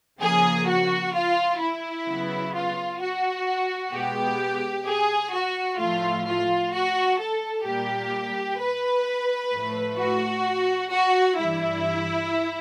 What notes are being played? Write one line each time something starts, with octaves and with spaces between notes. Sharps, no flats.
C#3 F3 A#3 G#4
F#4
F4
E4
C#3 F#3 B3
F4
F#4
B2 G#3 B3 G4
G#4
F#4
A2 F3 A3 F4
F4
F#4
A4
A#2 G3 A#3 G4
B4
A2 F3 A3
F#4
F#4
G2 E3 G3 E4